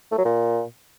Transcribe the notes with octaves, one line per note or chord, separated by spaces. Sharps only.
A3
F#3
A#2